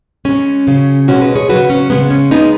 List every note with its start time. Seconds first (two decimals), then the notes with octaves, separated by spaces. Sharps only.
0.25 C#3 G#3 C#4
0.67 C#3 F#3
1.08 B2 G#3 C#4 F#4
1.21 F#4 B4
1.36 G#4 C#5
1.49 C#3 F#3 F#4 B4
1.70 C#4
1.90 C#3 G#3 B3
2.04 B3
2.10 C#4
2.31 C#3 G#3 B3 D#4